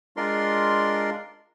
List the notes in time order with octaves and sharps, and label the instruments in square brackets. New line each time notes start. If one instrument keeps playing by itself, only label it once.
[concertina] G#3 D4 F4 A#4 D5 C6